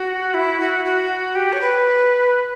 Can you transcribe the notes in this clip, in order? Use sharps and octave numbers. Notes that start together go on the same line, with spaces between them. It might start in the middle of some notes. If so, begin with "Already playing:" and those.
Already playing: F#4
E4
F#4
F#4
G4
C#5
B4